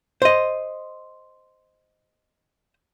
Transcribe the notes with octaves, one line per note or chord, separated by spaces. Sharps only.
C5 D#5